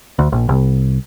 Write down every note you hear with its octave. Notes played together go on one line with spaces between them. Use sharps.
D2
A#1
C2